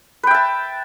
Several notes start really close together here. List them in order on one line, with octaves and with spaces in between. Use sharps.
B4 G5 E5 A5